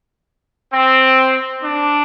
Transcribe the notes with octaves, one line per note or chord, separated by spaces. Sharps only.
C4
D4